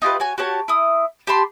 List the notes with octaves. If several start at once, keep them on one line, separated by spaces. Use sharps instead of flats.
D#4 F4 G4 B4
F#4 C#5 G#5
F#4 G4 C#5 A5
E4 D#6
G4 A5 B5 C6